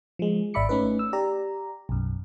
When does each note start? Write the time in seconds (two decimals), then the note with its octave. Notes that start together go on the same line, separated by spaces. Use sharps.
0.19 F3 G#3
0.54 G#1 D5 E5 B5 D6 C#7
0.69 A3 C#4 D#4 B4
0.99 E6
1.13 G4 D5 A#5
1.89 B1 F#2